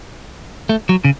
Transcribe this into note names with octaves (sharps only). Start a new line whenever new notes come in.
A3
F#3
C#3